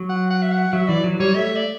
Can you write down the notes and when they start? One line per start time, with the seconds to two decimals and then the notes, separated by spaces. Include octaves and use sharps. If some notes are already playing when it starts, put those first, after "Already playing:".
Already playing: F#3
0.09 F#5
0.31 F#5
0.42 E5
0.52 F#5
0.73 F#3 E5
0.88 E3 D5
1.04 F#3
1.20 G3 C#5
1.35 A3 E5
1.56 D5